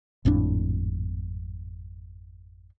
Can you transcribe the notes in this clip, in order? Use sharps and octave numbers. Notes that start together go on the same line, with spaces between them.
G#1 F2 A2 D4